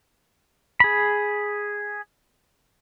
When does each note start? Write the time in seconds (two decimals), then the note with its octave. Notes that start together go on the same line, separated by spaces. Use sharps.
0.80 G#4 B5